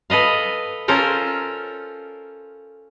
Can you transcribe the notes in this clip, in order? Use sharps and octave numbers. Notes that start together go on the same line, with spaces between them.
A4 B4 D#5 F5
C#4 F4 A4 A#4 C5